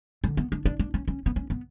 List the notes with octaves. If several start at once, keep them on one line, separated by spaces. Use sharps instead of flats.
D3
B3
D4
D4
D4
C#4
C#4
B3
C#4
B3